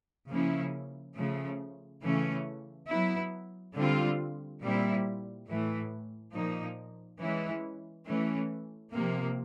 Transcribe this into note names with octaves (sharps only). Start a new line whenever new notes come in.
C#3 F3 A#3 C#4 E4
C#3 F3 A3
C#3 E3 A3 C#4
F#3 B3 E4
D3 G3 C4 F4
A#2 G3 C4 E4
A2 E3 A3
A#2 F3 A#3 D#4
E3 G#3 C#4 E4
E3 A3 C#4
C3 F3 A#3